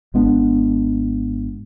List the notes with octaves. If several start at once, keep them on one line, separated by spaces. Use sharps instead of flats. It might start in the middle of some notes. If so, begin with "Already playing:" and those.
G#1 G#3 B3 D4